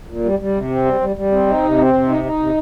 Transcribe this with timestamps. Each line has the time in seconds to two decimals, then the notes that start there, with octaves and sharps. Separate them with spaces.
0.08 A#2
0.24 G3
0.39 G3
0.54 C3
0.70 C4
0.85 G3
1.00 G3
1.16 G3
1.32 C4
1.47 D#4
1.63 C3
1.77 C4
1.93 C3
2.08 D#4
2.24 D#4
2.40 C3